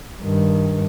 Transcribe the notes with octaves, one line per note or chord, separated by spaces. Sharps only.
G2 D#3